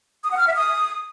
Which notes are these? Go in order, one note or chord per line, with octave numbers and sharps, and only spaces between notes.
D#6
F#5
F6
E5
D#6